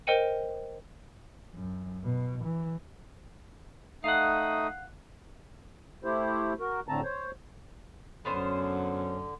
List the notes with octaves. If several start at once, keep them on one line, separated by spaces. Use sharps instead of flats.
A#4 C5 D#5 G5 C#7 D#7
F#2
B2
E3
A3 D#4 F5 F#5 D#6
A3 E4 G4 C5
F#4 A#4
A2 D3 A3 C4 A5 A#5
C5 C#5
F#2 D3 B3 C#4 C5